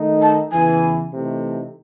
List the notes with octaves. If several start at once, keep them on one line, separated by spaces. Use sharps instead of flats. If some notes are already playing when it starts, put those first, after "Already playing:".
Already playing: D#3 A3 D#4
A5
E2 C#3 E3 G#5
C3 E3 A3 D#4